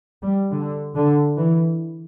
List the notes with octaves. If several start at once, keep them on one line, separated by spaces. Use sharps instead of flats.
G3
D3
D3
E3